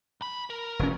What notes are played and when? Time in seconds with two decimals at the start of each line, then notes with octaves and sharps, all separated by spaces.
0.21 B1 B5
0.50 A#4
0.79 F1 C#4